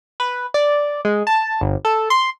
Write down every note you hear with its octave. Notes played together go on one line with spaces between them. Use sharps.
B4
D5
G#3
A5
G1
A4
C6